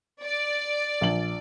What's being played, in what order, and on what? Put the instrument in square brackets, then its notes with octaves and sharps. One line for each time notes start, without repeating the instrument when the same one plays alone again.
[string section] D5
[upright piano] A#1 F#7